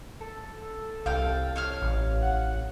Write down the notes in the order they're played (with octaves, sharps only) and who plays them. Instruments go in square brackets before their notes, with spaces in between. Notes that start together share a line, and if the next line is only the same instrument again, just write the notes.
[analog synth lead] A4
[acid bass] C2 [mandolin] F5 G5
[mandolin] C#5 F5 F6
[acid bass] A1
[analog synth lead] F#5